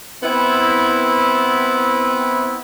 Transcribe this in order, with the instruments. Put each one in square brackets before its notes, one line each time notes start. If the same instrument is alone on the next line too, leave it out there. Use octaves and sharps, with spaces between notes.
[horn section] B3 C4 E4